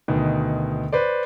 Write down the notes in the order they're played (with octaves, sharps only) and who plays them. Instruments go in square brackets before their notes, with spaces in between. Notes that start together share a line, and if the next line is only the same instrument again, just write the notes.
[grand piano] D2 B2 D#3
B4 C5 D5